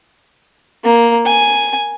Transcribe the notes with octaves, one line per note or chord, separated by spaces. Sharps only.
A#3
G#5